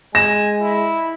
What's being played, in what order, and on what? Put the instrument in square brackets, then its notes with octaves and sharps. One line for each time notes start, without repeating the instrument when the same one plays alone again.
[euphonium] G#3 [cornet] G#5 [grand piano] A#6 E7
[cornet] E4